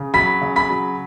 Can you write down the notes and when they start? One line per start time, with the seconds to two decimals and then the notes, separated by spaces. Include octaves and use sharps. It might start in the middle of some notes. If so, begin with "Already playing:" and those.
Already playing: C#3
0.14 F#3 B5 B6
0.42 C#3
0.56 B5 B6
0.70 F#3